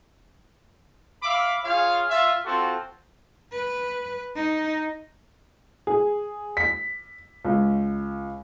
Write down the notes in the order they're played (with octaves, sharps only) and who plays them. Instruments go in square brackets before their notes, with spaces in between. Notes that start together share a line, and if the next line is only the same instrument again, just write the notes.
[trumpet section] E5 F5 B5 D6
F4 G#4 C#5 F5
F4 E5
C4 F4 F#4 A4
[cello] B4
D#4
[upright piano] G#4
B6
C#2